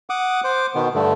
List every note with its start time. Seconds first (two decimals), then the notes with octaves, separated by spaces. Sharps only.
0.10 F#5 D6 D#6
0.44 C5 D6
0.75 B2 D#3 B3
0.95 G2 D3 A3